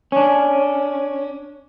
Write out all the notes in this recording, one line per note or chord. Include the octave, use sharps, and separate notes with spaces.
C#4 D4